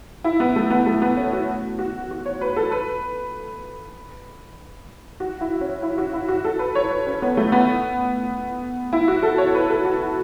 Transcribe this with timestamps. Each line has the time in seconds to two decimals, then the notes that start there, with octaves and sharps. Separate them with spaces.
0.24 E4
0.40 B3
0.56 A3
0.70 B3
0.86 A3
1.02 B3
1.17 C#4
1.33 F#4
1.79 F#4
2.11 F#4
2.26 C#5
2.41 B4
2.56 A4
2.72 B4
5.20 F#4
5.41 E4
5.61 C#4
5.83 E4
5.98 F#4
6.13 E4
6.29 F#4
6.44 A4
6.59 B4
6.75 C#5
6.91 B4
7.07 C#4
7.22 B3
7.37 A3
7.52 B3
8.93 E4
9.08 F#4
9.23 A4
9.38 C#5
9.55 B4
9.70 A4
9.85 F#4
10.01 E4